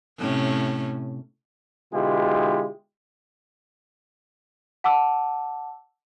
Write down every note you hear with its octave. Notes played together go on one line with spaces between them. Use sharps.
A2 C3 C#4
B2 D3 G#3 E4 F4 G4
F#5 A5 D6 E6